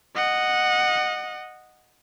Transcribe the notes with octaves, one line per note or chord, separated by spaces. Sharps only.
D#5 F#5